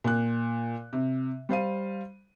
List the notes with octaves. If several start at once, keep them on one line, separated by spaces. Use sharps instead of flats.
A#2 F#6
C3
G3 C5 F5 D#7